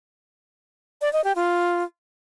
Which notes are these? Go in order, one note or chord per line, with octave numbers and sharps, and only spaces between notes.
D5
D#5
G4
F4